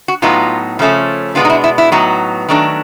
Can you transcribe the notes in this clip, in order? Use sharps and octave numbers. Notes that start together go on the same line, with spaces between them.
F#4
A2 F#3 B3 D#4 F4
C#3 F3 A3 C#4
B2 G#3 B3 D4 F4
D#4
E4
E4
E4
A2 F#3 B3 D#4
D#3 F#3 A3 D4